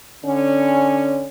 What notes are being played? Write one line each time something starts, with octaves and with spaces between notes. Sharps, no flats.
D3 C#4